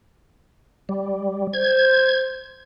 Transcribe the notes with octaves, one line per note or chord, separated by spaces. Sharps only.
G3
C5 G#6